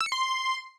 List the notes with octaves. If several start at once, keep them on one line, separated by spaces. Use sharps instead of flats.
E6
C#7
C6